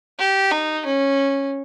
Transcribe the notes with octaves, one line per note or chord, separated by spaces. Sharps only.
G4
D#4
C#4